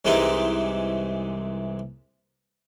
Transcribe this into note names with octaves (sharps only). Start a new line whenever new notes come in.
C2 C3 E3 G#3 D#4 G4